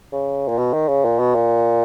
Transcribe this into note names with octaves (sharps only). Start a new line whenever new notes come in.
C#3
A#2
B2
D#3
C#3
A#2
B2
A#2